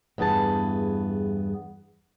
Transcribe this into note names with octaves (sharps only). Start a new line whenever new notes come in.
E2 G2 B3 G#4 A5